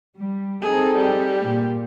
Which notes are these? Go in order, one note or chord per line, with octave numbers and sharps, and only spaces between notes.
G3
C4 D#4 G#4 A4
G3
A#2